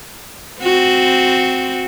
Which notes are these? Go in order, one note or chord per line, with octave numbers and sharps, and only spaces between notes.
C4 F#4